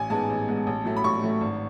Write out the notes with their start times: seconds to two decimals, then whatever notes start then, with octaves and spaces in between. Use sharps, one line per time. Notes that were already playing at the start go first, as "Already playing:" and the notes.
Already playing: A1 G#5
0.10 G#2 G#3 B3 A5
0.30 A1
0.48 G#2 G#3 B3
0.67 A1
0.85 A2 F#3 A3
0.96 B5
1.04 A1 C#6
1.22 A2 F#3 A3
1.41 G#1